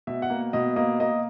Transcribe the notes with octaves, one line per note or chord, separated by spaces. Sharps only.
B2 E5
F#5
A#3
B2 D#5
A#3 D#5
A#3 D#5